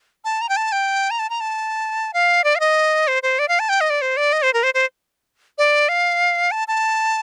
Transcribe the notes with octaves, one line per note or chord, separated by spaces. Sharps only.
A5
A#5
G5
A5
G5
A#5
A5
A#5
A5
F5
D5
F5
D#5
C5
C5
D5
F5
A5
G5
D#5
D5
C5
D5
D#5
C5
A#4
C5
C5
D5
F5
A5
A5